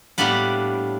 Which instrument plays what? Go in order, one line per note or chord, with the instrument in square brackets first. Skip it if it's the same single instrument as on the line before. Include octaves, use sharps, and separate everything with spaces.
[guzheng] A2 G3 A#3 B3 D4 B4